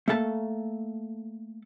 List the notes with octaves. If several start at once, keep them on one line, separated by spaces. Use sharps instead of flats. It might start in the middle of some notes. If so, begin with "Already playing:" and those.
A3 A#3 A4 A5